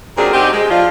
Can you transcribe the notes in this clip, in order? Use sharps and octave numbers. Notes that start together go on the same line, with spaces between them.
A#2 F#3 C4 D4 G#4 A#4
G#3 C4 D#4 F#4 G4
G#3
F3 D4 F4